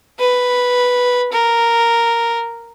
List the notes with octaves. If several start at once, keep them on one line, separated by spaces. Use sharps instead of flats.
B4
A#4